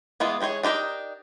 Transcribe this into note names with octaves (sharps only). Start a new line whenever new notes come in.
E3 G#3 B3 F4
E3 G#3 D#4 G#4 C#5
D4 D#4 G4 A#4